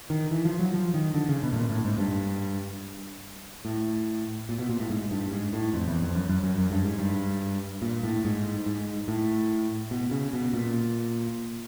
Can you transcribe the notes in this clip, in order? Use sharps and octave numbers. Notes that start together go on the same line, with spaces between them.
D#3
E3
F3
F#3
F3
D#3
D3
C#3
B2
A2
A#2
A2
G#2
G2
A2
A#2
B2
A#2
A2
G#2
G2
G#2
A2
F2
E2
F2
F#2
F#2
F#2
F#2
G2
G#2
G2
A#2
A2
G#2
G#2
A2
B2
C#3
B2
A#2